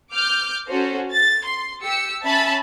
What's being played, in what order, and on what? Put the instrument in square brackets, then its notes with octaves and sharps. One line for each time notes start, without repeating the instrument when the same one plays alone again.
[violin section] D6 F6 G6
C#4 F#4 A4 C5
A6
C6
G4 E6 C#7
C#4 E5 A5 B5